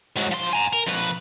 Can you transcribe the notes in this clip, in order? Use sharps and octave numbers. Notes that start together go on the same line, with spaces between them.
G#2 F#3
F3 C6
G#5 A#5
A#4
F2 B4